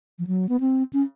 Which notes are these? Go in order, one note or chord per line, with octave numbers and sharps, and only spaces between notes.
F3
F#3
B3
C4
C#4